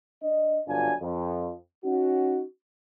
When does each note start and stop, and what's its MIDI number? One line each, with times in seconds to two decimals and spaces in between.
0.23 0.60 62
0.23 0.60 75
0.68 0.92 31
0.68 0.92 42
0.68 0.92 62
0.68 0.92 65
0.68 0.92 80
1.00 1.53 41
1.85 2.43 61
1.85 2.43 63
1.85 2.43 66